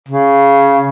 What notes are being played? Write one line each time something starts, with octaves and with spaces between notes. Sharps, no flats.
C#3